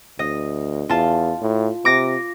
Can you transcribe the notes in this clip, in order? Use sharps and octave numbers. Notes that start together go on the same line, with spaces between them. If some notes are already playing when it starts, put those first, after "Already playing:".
D2 D#5
E2 F4 A5
A2
C3 D6 A#6